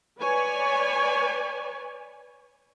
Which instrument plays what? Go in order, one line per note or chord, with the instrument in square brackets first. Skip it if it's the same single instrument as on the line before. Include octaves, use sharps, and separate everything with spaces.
[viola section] B4 C#5 D5 G#5